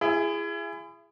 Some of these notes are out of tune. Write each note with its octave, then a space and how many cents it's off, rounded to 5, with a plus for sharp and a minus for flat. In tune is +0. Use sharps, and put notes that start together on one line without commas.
E4 +35 G#4 -10